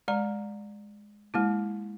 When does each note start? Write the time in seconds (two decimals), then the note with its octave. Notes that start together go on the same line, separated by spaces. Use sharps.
0.08 G#3 D5 A#5
1.34 G#3 A#3 E4